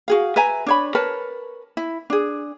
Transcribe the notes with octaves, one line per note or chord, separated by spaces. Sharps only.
F#4 G#4 F5
B4 E5 G#5 A#5
D4 C#5 B5
A#4 B4 C#5 A5
E4
D4 G#4